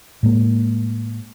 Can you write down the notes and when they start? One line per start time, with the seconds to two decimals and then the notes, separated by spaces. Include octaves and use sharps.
0.23 A2 G#3 A#3